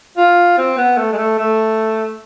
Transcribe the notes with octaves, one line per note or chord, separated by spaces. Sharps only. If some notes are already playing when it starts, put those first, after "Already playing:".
F4
C4
B3
A3
G#3
A3
A3